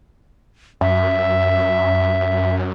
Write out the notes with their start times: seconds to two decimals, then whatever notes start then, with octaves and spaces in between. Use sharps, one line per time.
0.81 F#2 E5